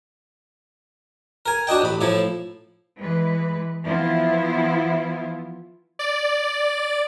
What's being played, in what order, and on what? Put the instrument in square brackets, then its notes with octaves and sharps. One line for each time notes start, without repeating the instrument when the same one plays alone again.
[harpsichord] A#4 G#5
D4 F#4 D#5 G5
A1 B5
A2 F3 E4
[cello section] E3 G#3 B4
E3 F3 B3 E4 F4
[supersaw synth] D5